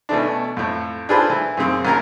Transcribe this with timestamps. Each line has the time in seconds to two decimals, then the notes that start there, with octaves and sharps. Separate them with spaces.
0.09 B2 E3 A3 D4
0.57 F2 A2
1.09 D4 F4 G#4 A4 B4 C5
1.30 E3
1.57 F#2 C#3 C4
1.85 A#1 C#4 A#4 A#5